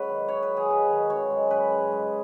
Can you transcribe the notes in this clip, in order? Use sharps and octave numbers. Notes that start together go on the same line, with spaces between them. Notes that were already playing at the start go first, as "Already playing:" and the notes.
Already playing: G#2 F#3 C#4 G#4 B4 C#5
D#3
G#2 C#5
B4
F#3
G#4
G#2 B4
D#3
F#2 C#5
G#3
F#2 B4
C#3
G#2